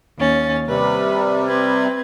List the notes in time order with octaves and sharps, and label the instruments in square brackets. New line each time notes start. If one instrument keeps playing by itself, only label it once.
[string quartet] D#2 C#4 A6
[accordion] C3 G3 [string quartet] B4
[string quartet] C4 B4 G#6